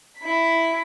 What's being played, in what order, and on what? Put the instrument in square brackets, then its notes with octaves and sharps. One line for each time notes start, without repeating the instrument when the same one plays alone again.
[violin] E4 B6